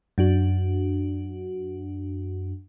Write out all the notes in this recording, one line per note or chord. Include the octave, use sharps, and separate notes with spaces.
F#2 D4 F#4